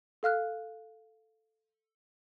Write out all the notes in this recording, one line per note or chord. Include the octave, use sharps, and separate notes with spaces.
A4 F5 F6 F#6